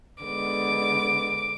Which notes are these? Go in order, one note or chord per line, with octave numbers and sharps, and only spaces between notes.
D3 G#3 B3 D6